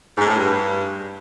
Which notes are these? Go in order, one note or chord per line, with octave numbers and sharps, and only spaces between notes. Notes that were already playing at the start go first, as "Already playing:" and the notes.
G#2
A2
G2